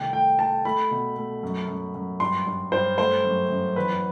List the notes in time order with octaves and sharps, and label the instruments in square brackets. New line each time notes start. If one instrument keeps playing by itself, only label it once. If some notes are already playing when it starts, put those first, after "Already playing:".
Already playing: [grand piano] C2 D#3 A3 G5
A3 G5
A3 A5
A3 B5
B2
A3
F#2
F#2
F#2
G2 C6
G2
G2 C5
A3 C5
F#2
F#2
E2 B4